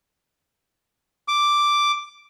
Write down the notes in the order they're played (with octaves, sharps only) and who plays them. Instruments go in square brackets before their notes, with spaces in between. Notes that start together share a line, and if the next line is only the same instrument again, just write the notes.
[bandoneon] D6